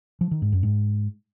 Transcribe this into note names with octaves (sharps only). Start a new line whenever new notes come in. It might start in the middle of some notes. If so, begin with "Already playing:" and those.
F3
D#3
G#2
F#2
G#2